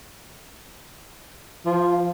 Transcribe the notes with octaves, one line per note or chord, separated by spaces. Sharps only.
F3